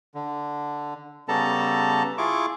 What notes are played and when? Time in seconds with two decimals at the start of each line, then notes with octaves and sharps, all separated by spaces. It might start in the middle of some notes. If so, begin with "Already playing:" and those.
0.15 D3
1.28 C#3 G3 B3 A4 A5 A#5
2.18 E4 F4 G#4 C#6 D6